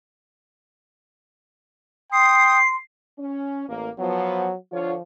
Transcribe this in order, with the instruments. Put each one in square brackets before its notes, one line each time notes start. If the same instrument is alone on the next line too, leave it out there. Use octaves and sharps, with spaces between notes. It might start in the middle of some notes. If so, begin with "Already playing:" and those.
[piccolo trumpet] G5 [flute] C6 [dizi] D#6 [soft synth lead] C7
[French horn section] C#4
[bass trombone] A1 [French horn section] A#3
[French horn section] F3 B3 [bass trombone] F#3
[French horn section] D3 F4 C#5 [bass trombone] F3